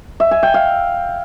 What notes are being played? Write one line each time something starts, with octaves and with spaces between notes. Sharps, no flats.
E5
G#5
G5
F5